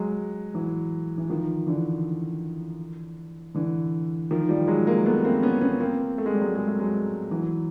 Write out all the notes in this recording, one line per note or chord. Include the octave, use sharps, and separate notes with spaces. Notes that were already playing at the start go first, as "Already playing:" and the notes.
Already playing: F#3 G#3
E3 F#3
E3
D#3 F3
D3 E3
D3 E3
D#3 F3
F3 G3
F#3 G#3
G#3 A#3
A3 B3
A#3 C4
B3 C#4
B3 C#4
A#3 C4
A3
G#3
G3
F#3 G#3
G#3
A3
F#3 G#3
E3 F#3